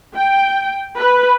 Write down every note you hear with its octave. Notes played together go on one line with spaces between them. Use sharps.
G5
B4